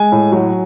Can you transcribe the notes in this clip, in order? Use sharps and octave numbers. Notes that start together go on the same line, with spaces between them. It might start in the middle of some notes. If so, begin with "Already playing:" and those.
Already playing: G#3 G#5
A2
F#3